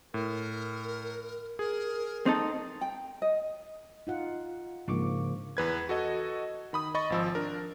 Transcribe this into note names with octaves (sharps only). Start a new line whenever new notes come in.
A2 A#4
G#4 A#4
C4 D#4 A4
G5
D#5
D#4 F4 F#5
G#2 C#3 F3 A#3 D4 C#6 D6
E2 B4 G#6
F#4 A4 D#5
D#3 B5 D#6
D#5 B5 C#6 A6
G#1 F3 E6
D4 A#4